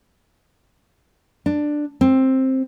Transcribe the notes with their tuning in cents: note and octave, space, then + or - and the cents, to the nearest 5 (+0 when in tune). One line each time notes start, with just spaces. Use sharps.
D4 +10
C4 +10